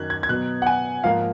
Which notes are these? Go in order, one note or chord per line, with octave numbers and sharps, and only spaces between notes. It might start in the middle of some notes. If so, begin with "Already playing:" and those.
Already playing: F#2 D#3 F#3 C#4 F#6 G#6
G#6
G#6
B2 F#3 B3 F#6
F#5
G#5
G#2 F3 A#3 F5